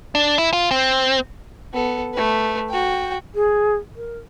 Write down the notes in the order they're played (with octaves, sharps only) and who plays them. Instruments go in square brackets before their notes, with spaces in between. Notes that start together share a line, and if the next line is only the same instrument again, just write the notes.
[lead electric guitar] D4
E4
F4
C4
[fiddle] B3 A4
A3 B4
F#4 G5
[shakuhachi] G#4
A#4